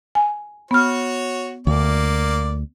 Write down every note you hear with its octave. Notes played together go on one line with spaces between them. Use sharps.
G#5
B3 F#4 C#5 F6
D2 A#3 D5